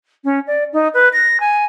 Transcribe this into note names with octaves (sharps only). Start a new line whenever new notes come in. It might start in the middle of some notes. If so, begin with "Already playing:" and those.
C#4
D5
D#4
B4
A#6
G#5